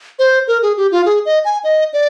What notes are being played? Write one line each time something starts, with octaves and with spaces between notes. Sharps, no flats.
C5
A#4
G#4
G4
F4
G#4
D#5
G#5
D#5
D5